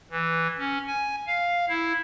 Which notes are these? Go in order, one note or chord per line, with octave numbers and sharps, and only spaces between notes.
E3
C#4
G#5
F5
E4